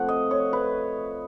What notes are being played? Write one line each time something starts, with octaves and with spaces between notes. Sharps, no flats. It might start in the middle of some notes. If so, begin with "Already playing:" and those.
Already playing: C3 F3 A3 F#5
D#5
C#5
B4